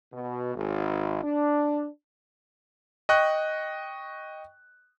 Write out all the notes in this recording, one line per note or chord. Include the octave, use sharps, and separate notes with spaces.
B2
G#1
D4
D#5 G5 C#6 F#6